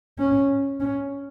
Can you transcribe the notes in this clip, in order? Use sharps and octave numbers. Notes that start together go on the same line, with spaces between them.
C#4
C#4